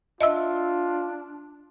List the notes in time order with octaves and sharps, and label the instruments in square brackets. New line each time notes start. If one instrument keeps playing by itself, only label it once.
[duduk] D4 [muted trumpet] F4 [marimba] D#5 E5 E6